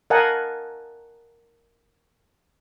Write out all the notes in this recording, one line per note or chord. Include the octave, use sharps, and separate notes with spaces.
A#4 D#5 F5 F#5 G#5 A5